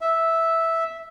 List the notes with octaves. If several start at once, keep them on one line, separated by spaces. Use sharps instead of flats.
E5